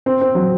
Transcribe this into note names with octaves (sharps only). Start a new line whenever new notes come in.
C4
C4
F#3